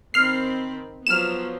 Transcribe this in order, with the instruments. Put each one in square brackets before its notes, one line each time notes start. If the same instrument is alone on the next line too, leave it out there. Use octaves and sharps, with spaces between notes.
[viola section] D#3 C4 B5 [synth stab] F6 C7
[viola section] F3 F#3 B3 [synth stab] F6 E7